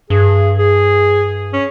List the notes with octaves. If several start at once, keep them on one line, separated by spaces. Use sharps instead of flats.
G2 G#4
G#4
C#4